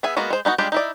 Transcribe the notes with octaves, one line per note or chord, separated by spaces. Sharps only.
B3 G#4 E5 G#5
G#3 A#3 B3 F#4
G#3 C5
B3 D#4 E4 F#4
G3 G#3 D4 F4 G4
D#4 E4 D5